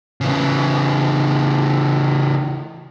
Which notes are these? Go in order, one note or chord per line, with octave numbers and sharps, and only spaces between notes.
C#3 E3